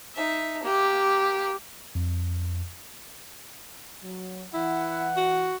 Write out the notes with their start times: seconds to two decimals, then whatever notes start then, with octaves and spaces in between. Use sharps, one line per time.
0.15 D#4 E5
0.63 A#3 G4
1.95 F2
4.02 F#3
4.54 E3 E4 F#5
5.17 F#4